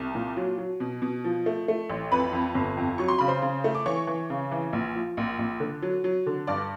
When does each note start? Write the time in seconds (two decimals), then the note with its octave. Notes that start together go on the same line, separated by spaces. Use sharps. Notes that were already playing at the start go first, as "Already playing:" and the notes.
Already playing: C2 A5
0.15 A#2
0.37 F#3
0.58 F#3
0.80 B2
1.02 B2
1.24 F3
1.46 A3
1.68 A3
1.90 A1
2.11 F2 B4 B5
2.33 F2
2.55 G1
2.77 F2
2.98 F#3 C#6
3.08 C6
3.19 C#3 B5
3.28 C5 C6
3.42 C#3
3.64 A3
3.75 D6
3.86 E3 C#5 C#6
4.07 E3
4.30 C#3
4.51 E3
4.73 A#1
4.95 F3
5.17 A#1
5.39 A#1
5.60 D3
5.82 F#3
6.04 F#3
6.26 D3
6.47 G2 D5 D6